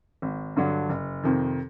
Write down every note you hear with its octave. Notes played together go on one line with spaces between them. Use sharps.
G#1
G2 D3 F#3
F#1
F2 C3 D#3